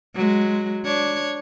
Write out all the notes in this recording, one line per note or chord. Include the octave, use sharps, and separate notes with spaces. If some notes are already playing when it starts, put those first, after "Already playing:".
F#3 G#3
D4 C#5